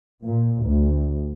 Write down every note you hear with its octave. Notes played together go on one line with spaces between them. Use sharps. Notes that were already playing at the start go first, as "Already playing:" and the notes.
A#2
D2